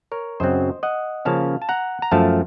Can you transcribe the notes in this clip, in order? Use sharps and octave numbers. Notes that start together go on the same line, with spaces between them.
A#4 C#5
F#2 C#3 F#3 C4 C5 D#5
D#5 F#5
C#3 F3 A#3 C#4 F5 A5
A5
F#5 A#5
A#5
F#2 F3 A3 F5 A5